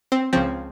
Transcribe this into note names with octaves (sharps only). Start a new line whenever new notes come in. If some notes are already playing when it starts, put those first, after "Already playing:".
C4
C#2 C#3 F3 C4